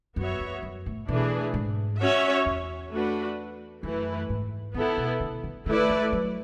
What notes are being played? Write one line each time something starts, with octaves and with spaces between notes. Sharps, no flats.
F#2 B3 F#4 C#5 E5
E2
F#2
A2
B2 E3 A3 D4 G#4 B4
G#2
C#4 F#4 C#5 E5
E2
A3 D4 F#4 B4
F#2 E3 A3 E4 B4
G#2
D3 B3 E4 A4
B2
D3
D3
D3 A3 E4 B4 D5
E3
F#3